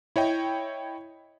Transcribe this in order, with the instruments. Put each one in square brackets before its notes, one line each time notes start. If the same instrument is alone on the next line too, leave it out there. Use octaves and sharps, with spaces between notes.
[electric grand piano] E4 C#5 D#5 G5